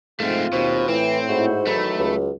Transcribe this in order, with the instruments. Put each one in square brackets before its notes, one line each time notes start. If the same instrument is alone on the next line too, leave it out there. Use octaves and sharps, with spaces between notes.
[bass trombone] G#2 [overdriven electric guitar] A3 C4 [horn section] F4
[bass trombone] D#2 [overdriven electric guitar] B2 [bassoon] C4
[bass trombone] A2 [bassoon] E3 [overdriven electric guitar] C4
[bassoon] G#2 [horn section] E4 F#4 C5
[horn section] D#3 E3 B5 [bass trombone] F#3 [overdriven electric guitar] A3
[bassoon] C#2